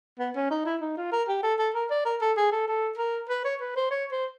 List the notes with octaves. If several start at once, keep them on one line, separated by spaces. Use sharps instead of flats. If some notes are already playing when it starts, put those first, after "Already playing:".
B3
C#4
D#4
E4
D#4
F4
A#4
G4
A4
A4
A#4
D5
A#4
A4
G#4
A4
A4
A#4
B4
C#5
B4
C5
C#5
C5